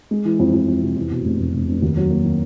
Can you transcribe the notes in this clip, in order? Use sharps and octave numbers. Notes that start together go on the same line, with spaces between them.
G#3
E3
F2
F2
F2
C3
E2
B2
F1
F1
F1
F1
D#2
F#3
A#3
D#3